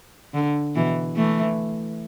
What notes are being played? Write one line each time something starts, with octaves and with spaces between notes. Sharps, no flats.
D3
B2 E3
E3 A3